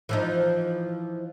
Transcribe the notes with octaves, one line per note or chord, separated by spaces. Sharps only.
E3 F3 D#4